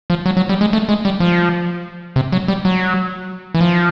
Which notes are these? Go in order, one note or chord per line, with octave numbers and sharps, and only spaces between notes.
F3
F#3
F#3
G3
G#3
A3
G#3
G3
F3
C3
F#3
G3
F#3
E3
F3